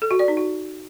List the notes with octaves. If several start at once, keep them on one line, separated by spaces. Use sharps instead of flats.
A4
F#4
D5
D#4
F#4